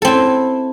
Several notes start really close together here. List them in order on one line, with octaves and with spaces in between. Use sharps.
A4 C4 E4